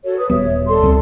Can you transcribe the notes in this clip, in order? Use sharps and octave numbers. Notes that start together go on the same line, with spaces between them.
F#4 A4 C#5
B4 D#6
D#1 G3 B3 C#5 E5
A4 D5 C6
C#2 G3 C4